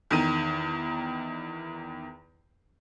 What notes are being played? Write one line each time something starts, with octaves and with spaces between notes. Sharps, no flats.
E2 D#3 D#7